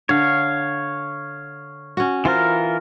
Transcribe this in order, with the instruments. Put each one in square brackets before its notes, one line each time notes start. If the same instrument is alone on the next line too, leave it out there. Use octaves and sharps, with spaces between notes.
[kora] D3 [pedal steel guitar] C#5 F5
[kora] C#4 F#4
[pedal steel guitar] E3 F4 A#4 [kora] C5